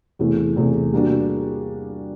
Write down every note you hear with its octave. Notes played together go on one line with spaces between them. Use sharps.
E2 C3 E3 A3
E2 C3 E3 A3
G3 A#3 D4 F#4